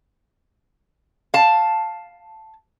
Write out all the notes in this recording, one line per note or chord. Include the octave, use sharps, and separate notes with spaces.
F5 A5